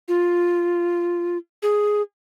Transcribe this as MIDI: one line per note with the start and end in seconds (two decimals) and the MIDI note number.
0.08 1.38 65
1.63 2.02 68